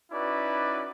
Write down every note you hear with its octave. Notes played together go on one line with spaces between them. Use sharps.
C#4 D#4 E4 F#4 B4 D5